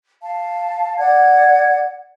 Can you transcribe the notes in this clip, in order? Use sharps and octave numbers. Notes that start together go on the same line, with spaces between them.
F5 A5
D5 F#5 G#6